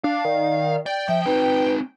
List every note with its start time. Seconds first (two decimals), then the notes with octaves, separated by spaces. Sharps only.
0.04 D4 F5
0.25 D#3 D5
0.86 D5 G5
1.09 F3 E5
1.26 C4 D#4 B4